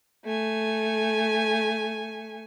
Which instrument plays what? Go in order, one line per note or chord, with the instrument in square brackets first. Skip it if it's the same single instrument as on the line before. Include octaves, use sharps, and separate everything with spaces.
[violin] A3 G#5